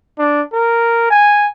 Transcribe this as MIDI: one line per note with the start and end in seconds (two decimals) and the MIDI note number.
0.19 0.42 62
0.53 1.08 70
1.10 1.49 80